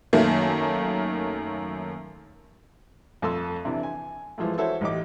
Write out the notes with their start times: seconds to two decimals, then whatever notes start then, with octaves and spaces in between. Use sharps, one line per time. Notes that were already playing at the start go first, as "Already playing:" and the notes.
0.13 F#2 D#3 A3 A#3
3.22 F2 A3 A4 C6 E6
3.65 C3 E3 D4
3.83 G#5
4.38 E3 F3 G#3 A3
4.58 E4 F#4 A4 C5 C#5
4.81 A1 D#4 G4 D6